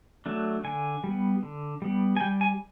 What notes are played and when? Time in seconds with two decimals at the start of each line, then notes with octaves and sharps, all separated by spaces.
0.26 F#3 A3 D4
0.64 D3 G#5
1.04 G3 B3
1.43 D3
1.82 G3 B3
2.17 G#5
2.21 G3 G5
2.41 G#5